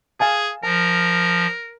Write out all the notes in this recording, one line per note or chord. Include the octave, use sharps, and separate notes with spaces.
G#4 F5 G#5 A5
F3 A#4 A5